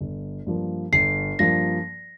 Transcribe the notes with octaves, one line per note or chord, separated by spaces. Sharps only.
G1
G2 F3 A#3
G1 C7
G2 F3 A#3 A#6